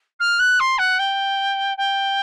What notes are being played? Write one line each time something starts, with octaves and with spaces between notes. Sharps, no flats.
F6
F#6
C6
F#5
G5
G5